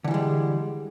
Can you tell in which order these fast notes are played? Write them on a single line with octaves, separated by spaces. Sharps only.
D3 E3 G3 G#3